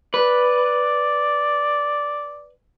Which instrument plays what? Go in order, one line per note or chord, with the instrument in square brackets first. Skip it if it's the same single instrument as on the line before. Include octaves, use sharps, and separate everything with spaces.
[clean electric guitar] B4 [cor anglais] D5